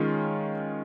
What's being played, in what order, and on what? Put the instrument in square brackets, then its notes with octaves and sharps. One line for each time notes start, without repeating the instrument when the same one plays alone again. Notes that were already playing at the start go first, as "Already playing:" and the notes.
Already playing: [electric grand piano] D#3 G#3 C#4 F4